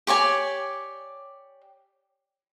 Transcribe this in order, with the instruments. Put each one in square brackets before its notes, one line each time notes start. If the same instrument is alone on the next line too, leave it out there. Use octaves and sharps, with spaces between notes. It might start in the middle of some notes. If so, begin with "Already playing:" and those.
[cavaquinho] G4 C#5 D5 G#5